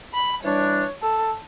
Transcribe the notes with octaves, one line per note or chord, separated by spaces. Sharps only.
B5
E3 G3 D4 C#5
A4